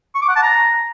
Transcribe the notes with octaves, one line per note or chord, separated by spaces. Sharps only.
C#6
D6
F#5
A5
A#5